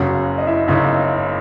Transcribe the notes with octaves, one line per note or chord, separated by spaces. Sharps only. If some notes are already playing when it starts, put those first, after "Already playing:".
Already playing: F#1 F#2 C#3 F#3 F#4
D#5
E4 E5
F#1 F#2 C#3 D#4 D#5